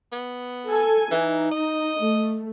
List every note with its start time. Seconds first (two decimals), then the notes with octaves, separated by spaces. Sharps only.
0.12 B3
0.67 A4 G#5
1.11 E3 D#4
1.51 D#5
1.99 A3